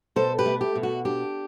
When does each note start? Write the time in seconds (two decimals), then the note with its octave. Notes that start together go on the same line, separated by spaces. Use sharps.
0.16 B2 A4 C5
0.38 G4 B4
0.46 A3
0.61 G4
0.76 B2
0.83 F#4
1.05 D4 G4